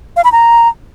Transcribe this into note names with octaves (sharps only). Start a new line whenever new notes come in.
F5
B5
A#5